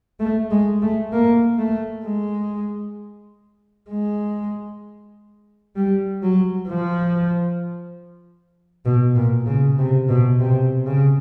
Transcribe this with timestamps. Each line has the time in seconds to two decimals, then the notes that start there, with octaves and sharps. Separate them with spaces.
0.20 A3
0.51 G#3
0.82 A3
1.13 A#3
1.59 A3
2.05 G#3
3.90 G#3
5.76 G3
6.22 F#3
6.69 F3
8.85 B2
9.15 A#2
9.46 C#3
9.78 C3
10.09 B2
10.40 C3
10.86 C#3